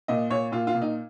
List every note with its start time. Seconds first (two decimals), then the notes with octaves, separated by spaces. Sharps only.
0.08 A#2 D#5
0.30 A#2 C#5
0.52 A#2 F4
0.67 F4
0.75 A#2
0.82 D#4